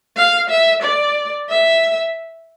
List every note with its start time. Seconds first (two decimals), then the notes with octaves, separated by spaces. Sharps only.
0.17 F5
0.50 E5
0.82 D5
1.49 E5